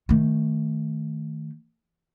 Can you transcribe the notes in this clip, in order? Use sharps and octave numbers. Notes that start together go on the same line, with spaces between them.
D#3 A3